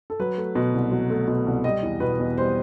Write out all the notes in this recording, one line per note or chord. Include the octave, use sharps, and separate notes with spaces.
A4
F#3 B4
A3
B2
C2
F#3
A3
B2
C2
G3 D#5
E2
B2 B4
E2
G3 C5